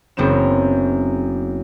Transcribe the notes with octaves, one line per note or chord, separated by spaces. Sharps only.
F#1 F#2 B3 C4 E7